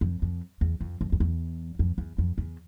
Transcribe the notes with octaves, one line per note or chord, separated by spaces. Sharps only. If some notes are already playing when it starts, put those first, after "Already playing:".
F2
F2
E2
F2
F2
F2
E2
F2
E2
F2
E2